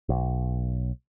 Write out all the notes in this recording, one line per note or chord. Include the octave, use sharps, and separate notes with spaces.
B1